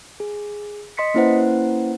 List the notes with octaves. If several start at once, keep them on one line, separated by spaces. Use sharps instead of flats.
G#4
D#5 C6 B6 C#7
A#3 C#4 E4 B4 C5 F#5